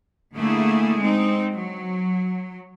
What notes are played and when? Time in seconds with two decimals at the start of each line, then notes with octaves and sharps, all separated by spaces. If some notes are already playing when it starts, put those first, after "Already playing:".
0.35 D3 A3 A#3 E4 G#4
0.98 G#3 C4 D#4
1.54 F#3